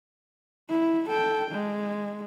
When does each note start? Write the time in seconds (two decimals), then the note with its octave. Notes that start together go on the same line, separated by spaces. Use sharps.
0.69 E4
1.10 A4 G5
1.52 G#3